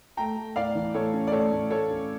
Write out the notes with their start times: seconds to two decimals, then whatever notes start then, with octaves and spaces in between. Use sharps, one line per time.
0.17 A3 G5 A#5
0.37 A3
0.56 A2 D5 F5
0.75 E3
0.94 A2 A4 C#5
1.13 C#4
1.27 D5
1.32 A2 A4 C#5
1.52 A2
1.70 A3 A4 C#5
1.91 C#4